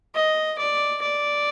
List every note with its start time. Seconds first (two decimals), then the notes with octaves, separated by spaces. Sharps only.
0.15 D#5
0.58 D5
1.02 D5